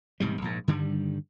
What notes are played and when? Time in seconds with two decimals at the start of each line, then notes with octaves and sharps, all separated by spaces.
0.20 E1 G#2 C3 G3
0.42 A#1 G#2
0.68 G2 D3 D#3 G3